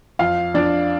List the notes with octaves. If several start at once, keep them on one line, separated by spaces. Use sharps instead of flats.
F2 F4 F5
F2 D4 D5